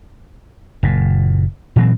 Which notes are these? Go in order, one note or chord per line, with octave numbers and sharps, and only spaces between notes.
F#1 A#2
A#2 E3 F#3 C4